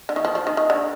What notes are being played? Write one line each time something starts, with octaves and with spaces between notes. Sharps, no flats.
D3
D#3
F3
F3
D#3
D#3
D3